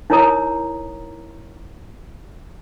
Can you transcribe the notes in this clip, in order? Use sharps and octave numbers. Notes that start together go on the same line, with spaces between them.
D#4 E4 A#4 C#5 A#5 D#6